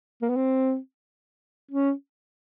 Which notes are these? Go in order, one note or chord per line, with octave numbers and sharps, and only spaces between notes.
A#3
B3
C4
C#4